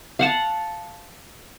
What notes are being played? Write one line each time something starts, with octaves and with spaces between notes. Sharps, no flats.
F5 F#5 A5